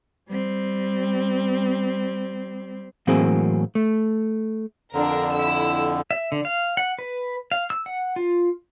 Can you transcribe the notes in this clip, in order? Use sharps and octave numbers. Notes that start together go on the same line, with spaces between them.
G3 C4
A2 E3 F#3 A#3 C4 G#4
A3
F2 D3 D4 A#4
E4 E6
E5
D3
F5
F#5
B4
F5
E6
F#5
F4